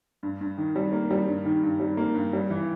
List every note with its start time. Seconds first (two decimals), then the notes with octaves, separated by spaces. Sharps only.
0.23 G2
0.41 G2
0.58 D#3
0.76 G3
0.93 A#3
1.11 G3
1.28 G2
1.45 D#3
1.63 G2
1.80 G3
1.97 A#3
2.14 G2
2.33 G3
2.50 E3